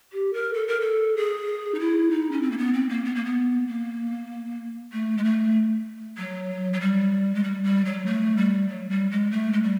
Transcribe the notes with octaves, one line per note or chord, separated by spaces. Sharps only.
G4
A#4
A4
A#4
A4
G#4
D#4
E4
D#4
C#4
C4
A#3
B3
C4
A#3
B3
A#3
B3
A#3
A3
G#3
A3
F#3
F#3
G3
G#3
G3
G3
F#3
A3
G3
F#3
G3
G#3
A3
G#3
G3